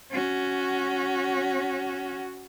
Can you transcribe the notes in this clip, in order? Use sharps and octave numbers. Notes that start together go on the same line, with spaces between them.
C#4 F#4